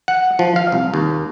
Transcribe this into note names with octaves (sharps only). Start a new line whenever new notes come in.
F#5
F3
F5
C2
D#2